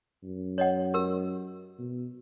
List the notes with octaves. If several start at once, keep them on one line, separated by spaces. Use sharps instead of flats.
F#2
C#5 D#5 F#5
G4 A#4 E6
B2